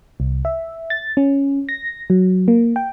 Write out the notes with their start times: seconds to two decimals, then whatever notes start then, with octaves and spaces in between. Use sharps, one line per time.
0.20 C2
0.45 E5
0.90 A6
1.17 C#4
1.69 A#6
2.10 F#3
2.48 A#3
2.76 G5